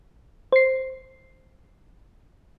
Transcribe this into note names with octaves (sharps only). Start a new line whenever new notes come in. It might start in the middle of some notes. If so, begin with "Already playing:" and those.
C5 C7